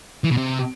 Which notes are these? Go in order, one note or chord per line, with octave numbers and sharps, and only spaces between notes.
E3
B2
C3